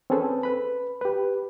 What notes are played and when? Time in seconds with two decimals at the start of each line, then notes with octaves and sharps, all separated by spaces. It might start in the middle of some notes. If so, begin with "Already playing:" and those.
0.10 C4 C#4 G#4 A4 B4 C5
0.43 B4 B5
1.01 G4 B4